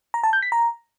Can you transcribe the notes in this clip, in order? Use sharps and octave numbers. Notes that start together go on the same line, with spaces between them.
A#5
A5
G6
B6
A#5